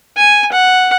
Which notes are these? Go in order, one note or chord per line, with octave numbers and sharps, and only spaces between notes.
G#5
F#5